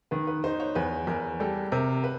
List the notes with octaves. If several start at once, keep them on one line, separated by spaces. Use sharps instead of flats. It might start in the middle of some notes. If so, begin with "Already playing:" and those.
D#3 B4
B4
D#4 C5
C#5
E2 B4
E2 A#4
G3 A4
C3 A#4
B4